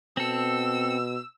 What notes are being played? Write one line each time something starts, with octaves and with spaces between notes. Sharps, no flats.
B2 C4 A4 E6